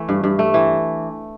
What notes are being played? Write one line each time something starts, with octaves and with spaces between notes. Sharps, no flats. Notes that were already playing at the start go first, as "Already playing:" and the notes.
Already playing: E3 A3
G2
G2
A3
E3